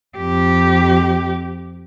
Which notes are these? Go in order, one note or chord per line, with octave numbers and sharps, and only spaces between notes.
F2 G4